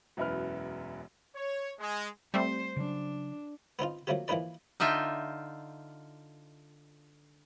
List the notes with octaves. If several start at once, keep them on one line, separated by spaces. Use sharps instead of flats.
E1 F#2 E4 B4 F6
C#5
G#3
G3 A3 C4 C5
C#3 F#3 D4
B3 C4 D#4 F4
F3 F#3 A3 A#3 C4 G4
E3 F3 A#3 D#4 B4 D5
D3 D#4 F4 E5 G5